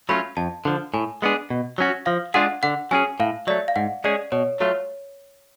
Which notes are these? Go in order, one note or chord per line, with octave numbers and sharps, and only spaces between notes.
F#3 A3 C#4 F4 B5
F2 A5
D3 F3
A2 G#5
G#3 B3 D4 G#4
B2
F#3 C#4 F#4
F3 F5
G#3 D4 F4 G#4 F#5
D3 F#5
F#3 C#4 G#4 G#5
A2 F5
F#3 A3 D5
F5
G#2 F#5
G#3 C#4 G#4 D5
B2 C#5
F#3 A3 F4 C#5